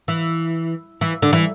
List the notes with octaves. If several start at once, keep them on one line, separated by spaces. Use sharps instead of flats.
E3
E3
D3
E3